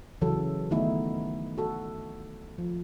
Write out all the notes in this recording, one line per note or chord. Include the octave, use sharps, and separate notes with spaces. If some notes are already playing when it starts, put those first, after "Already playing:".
C#3 E3 F#3 A4
D#3 A3 B3 D#4 E4
F#4 A4
F3